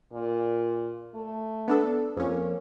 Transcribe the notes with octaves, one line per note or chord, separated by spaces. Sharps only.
A#2
A3
B3 D4 A4
F2 A#3 C#4